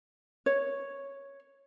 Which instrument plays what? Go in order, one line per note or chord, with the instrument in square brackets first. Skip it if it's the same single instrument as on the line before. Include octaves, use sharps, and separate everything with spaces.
[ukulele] C#5